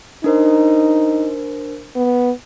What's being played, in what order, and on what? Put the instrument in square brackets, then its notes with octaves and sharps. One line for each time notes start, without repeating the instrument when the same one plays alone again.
[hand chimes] D4 A#4 C5 [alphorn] D#4
[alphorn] B3